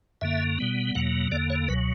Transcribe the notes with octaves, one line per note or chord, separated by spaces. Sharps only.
F#2 D3 A#3 E5
B2 G3 B3
E2 B2 F#3 A#3 F#5
E2 D3 A#3 D5
C#5
C#2 B2 F#3 B4